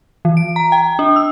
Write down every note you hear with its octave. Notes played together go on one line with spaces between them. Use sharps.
E3
D7
A#5
G5
D4
E6